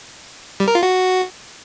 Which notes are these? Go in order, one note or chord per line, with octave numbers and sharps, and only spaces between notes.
G3
A#4
F4
F#4